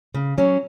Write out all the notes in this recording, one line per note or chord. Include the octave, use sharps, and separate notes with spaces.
C#3
F#3 C#4